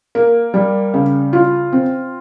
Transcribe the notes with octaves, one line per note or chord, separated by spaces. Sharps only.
A#3
G3
C#3
F4
C4